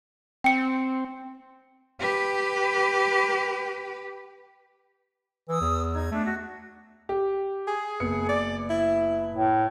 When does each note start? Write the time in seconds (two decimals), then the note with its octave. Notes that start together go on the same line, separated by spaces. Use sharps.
0.44 C4 G5 C#7
1.99 G4 B4
5.48 E3 D#6 E6
5.61 E2
5.94 D#4 G#6
6.11 A3 D4
6.24 F#4
7.09 G4
7.67 G#4
8.00 F#1 B3 C#7
8.29 D5
8.70 E4
9.34 A2